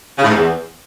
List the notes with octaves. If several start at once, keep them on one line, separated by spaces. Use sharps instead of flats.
C#3
A2
G#2
E2